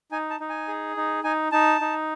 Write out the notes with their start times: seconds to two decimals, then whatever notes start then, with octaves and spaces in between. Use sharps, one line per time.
0.11 D#4 G#5
0.30 A5
0.40 D#4
0.49 G#5
0.68 G#4
0.97 D#4
1.24 D#4 G#5
1.52 D#4 A5
1.81 D#4